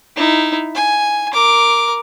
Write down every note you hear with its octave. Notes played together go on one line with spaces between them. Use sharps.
D#4 E4
G#5
A#4 D6